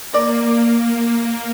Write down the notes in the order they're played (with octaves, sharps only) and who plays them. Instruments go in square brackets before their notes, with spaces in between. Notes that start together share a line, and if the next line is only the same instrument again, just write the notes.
[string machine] A#3 [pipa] A#4 D5